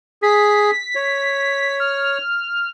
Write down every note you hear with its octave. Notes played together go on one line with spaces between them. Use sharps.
G#4 B6
C#5
F6